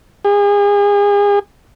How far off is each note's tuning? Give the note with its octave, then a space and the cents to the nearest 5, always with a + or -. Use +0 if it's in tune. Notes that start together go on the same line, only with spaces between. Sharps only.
G#4 -35